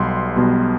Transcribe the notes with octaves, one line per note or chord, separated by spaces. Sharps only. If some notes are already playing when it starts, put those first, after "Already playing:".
Already playing: B1 B2 G3 B3 C6
B1 B2 G3 B3